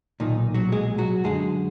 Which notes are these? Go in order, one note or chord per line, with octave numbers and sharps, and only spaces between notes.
B1 A#2 D#3 D#4
F#3 F#4
G#3 G#4
F#3 F#4
F#2 D3 G#3 G#4